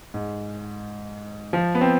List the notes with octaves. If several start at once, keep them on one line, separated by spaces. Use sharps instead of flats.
G#2
F3
B3
C4